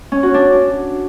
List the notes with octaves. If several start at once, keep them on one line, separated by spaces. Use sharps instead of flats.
C#4
F#4
D4